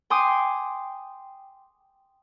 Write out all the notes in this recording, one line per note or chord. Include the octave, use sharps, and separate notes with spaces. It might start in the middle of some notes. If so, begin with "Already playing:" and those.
G5 G#5 C6 D6 D#6